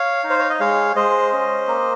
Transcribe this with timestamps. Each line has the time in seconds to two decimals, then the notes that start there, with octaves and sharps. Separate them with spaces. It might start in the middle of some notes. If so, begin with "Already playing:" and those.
Already playing: C#5 F5
0.24 D#4
0.30 C5
0.39 C#5
0.50 D#5
0.60 G#3 C#5 F5
0.96 G#3 C5 D#5
1.32 C#4
1.68 A#3